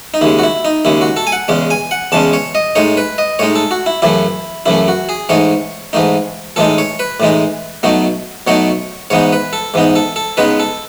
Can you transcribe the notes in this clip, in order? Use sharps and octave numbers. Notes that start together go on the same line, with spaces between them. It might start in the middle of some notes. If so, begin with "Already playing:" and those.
D#4
D#2 C#3 G#3 E4
F#4
E4
D#4
D#2 C#3 G#3 E4
F#4
A4
G#5
F#5
E2 C#3 G#3 C#4
G#5
F#5
E2 C#3 G#3 C#4 A5
C#5
D#5
A2 G#3 D#4 C#5
B4
D#5
A2 G#3 D#4 C#5
A4
F#4
E4
F#2 C#3 E3 A3 E4
F#2 C#3 E3 A3 E4
F#4
G#4
G#2 E3 A3 D#4 C#5
G#2 E3 A3 D#4
A2 E3 G#3 D#4 A4
C#5
B4
A2 E3 G#3 D#4
B2 F#3 A3 D#4
B2 F#3 A3 D#4 C#5
G#2 E3 B3 D#4 C#5
B4
A4
G#2 E3 B3 D#4
A4
A4
C#3 G#3 B3 D#4 B4
A4